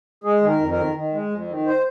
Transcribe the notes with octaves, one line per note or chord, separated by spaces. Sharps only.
G#3 G#4
D#3
A#4
F2
A#4
D#3
D#3
G#3
F2
D#3
C5